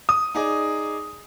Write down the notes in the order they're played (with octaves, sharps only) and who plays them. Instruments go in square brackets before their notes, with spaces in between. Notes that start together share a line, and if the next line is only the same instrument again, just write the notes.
[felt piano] D#6
[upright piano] D#4 G#4 D5